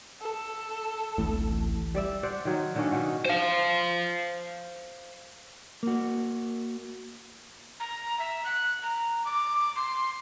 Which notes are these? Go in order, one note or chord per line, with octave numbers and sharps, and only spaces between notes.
A4
D1 A1 A2
G3 D5 E5
C5 D5 F#5
D#3 F#3
D3 D#3 A#3 C#4
B2 D#3 F#4
C5 F5
A#3 F#4
A#5
E5
F#6
A#5
D6
C6